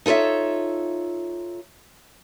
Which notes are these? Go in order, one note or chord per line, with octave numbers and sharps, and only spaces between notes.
D#4 F4 A4 C#5 E5